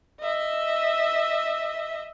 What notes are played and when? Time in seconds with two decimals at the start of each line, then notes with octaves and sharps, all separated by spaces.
0.21 D#5 E5